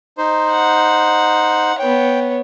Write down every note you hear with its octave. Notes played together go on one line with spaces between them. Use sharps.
D#4 C5
F#5
B3 C#5 G5